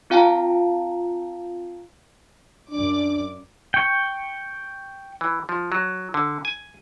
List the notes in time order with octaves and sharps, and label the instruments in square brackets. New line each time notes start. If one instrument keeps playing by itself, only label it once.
[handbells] C4 F4 F5 G5 A5 A#5
[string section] F#2 D5 D6 [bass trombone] D4
[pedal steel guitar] G5 C#6
[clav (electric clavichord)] E3
F3
F#3
D3
G#5